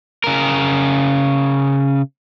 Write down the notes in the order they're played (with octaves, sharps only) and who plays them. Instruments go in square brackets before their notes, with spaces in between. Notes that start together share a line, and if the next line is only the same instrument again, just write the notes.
[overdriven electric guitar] C#3 A#4